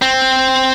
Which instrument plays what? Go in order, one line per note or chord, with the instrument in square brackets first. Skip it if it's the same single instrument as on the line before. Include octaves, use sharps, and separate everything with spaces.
[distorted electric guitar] C4